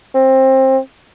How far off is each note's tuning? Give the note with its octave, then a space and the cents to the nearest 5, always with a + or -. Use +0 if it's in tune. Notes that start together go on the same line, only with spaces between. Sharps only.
C4 +20